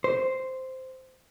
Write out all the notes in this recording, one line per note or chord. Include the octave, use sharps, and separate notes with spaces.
C5